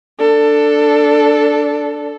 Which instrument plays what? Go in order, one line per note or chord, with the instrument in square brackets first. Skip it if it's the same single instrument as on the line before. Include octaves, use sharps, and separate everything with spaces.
[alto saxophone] D4 [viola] A4